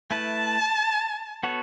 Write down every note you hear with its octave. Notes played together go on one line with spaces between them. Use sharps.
A3 E4 B4 A5
B3 F#4 A4 C#5